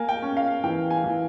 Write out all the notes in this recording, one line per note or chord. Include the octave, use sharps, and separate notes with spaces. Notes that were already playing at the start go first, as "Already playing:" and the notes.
Already playing: A#3 G#5
G5
C#4
F5
E3 G5
G#5
E3